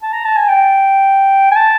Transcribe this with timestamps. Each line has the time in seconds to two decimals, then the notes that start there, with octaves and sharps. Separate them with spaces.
0.02 A5
0.13 A#5
0.25 A5
0.37 G#5
0.48 G5
1.51 G#5
1.56 A5